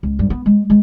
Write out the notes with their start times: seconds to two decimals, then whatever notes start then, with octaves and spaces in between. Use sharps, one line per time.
0.03 C#2
0.19 G2
0.30 B3
0.46 G#3
0.70 G#3